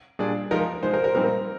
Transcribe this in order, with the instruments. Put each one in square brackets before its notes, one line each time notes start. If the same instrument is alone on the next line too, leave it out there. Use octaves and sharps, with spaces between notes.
[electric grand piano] A#2 G3 D4 G#4 D5
[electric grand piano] F3 G#3 D#4 [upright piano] A#4
[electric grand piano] F3 G#3 D#4 [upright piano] C5
[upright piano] A#4
A#4
[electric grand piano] A#2 G3 C4 D#4 [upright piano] A#4